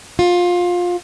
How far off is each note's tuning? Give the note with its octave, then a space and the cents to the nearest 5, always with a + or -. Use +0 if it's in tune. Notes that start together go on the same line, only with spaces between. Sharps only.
F4 +20